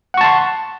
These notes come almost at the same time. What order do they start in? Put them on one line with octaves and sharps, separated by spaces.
F#5 C#6 A5 C6